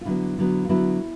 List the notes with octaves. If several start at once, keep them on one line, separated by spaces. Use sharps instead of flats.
F4
D3 F#3 B3 E4
D3 F#3 B3
F4
D3 F#3 B3 E4